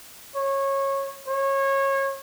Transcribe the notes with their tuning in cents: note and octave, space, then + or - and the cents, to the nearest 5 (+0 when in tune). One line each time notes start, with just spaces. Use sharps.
C#5 -20
C#5 -25